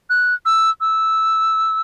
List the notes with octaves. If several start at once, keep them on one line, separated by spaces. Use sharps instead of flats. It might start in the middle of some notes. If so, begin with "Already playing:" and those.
F#6
E6
E6